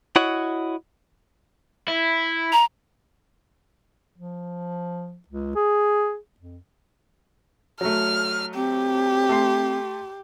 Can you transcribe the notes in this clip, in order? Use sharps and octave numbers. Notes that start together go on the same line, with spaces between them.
E4 F#4 C#5 D#5 F#5
E4
A#5
F3
C#2
G#4
F2
F#3 A3 F6
C4 G4
A3 C6 C7